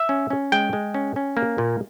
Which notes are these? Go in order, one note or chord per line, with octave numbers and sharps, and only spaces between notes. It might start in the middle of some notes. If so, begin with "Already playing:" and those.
Already playing: E5
C#4
C#4
G#3 G5
G#3
C#4
C#4
A#3
A#2